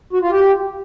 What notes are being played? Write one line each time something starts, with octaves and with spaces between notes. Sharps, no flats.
F#4
F4
G4